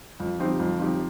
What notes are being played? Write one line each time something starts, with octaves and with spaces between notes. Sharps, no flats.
F2
F3 C4 D#4 G4
F2
F3 C4 D#4 G4